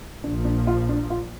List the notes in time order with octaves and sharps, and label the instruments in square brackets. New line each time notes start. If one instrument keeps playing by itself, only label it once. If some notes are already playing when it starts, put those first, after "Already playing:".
[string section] A#1 A#2 F3 [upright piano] D4
[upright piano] D4
F4
D4
F4